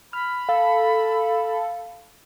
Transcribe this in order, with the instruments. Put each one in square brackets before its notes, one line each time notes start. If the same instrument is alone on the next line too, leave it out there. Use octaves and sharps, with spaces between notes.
[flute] B5 [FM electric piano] F6
[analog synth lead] A4 [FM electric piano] F5